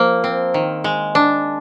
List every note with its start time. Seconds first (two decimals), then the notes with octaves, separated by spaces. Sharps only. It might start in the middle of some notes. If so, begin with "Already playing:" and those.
Already playing: F3 A#3
0.24 C4
0.54 D#3
0.84 G#3
1.15 D4